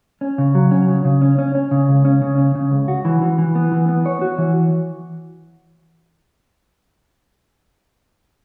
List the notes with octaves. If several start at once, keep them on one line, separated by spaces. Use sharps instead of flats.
C#4
C#3
F#3
C#4
C#3
C#3
C#4
C#4
C#4
C#3
C#2
C#4
C#3
C#4
C#3
C#2
F#4
E3
E3
E3
B3
E3
B3
C#5
F#4
E3